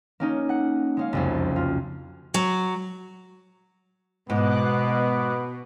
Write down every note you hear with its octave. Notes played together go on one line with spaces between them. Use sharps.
A#3 C#4 D#4
F#5
G#3 C#4 F5
F#1 C2 F2
F4
F#3
G#2 B2 B3 D#5 D6 F#6